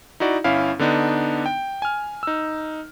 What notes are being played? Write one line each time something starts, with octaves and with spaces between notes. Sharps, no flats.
D#4 E4 F#4 D5
G1 C#4 E4 F5
D3 B3 D4 D#4
G5
G#5 F6
D#4 E6